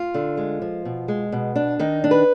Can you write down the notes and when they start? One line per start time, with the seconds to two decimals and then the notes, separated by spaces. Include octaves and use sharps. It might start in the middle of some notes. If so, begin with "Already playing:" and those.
Already playing: F4
0.14 D3
0.37 G#3
0.62 F3
0.85 B2
1.08 G#3
1.32 B2
1.56 D4
1.79 D#3 D#4
2.04 D4
2.11 B4